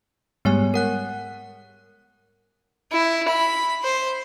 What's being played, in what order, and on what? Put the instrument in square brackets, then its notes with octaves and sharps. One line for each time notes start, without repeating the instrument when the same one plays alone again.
[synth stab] G#2 G3 G#3 [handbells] B3 C#5 G#5
[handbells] A#4 F#5 F#6
[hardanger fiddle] E4
B5
C5